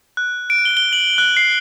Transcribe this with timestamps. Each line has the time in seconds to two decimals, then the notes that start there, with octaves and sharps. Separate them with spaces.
0.17 F#6
0.50 D7
0.65 G7
0.77 G7
0.93 F#7
1.18 F#6
1.37 C7